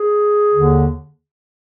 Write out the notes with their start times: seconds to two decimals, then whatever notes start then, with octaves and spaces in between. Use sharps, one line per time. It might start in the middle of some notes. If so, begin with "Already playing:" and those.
Already playing: G#4
0.54 D#2 D3